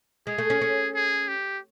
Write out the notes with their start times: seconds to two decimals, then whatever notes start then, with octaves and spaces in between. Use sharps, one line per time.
0.27 G#3 G#4
0.38 A3
0.50 C#4
0.62 C#4
0.95 G#4
1.28 G4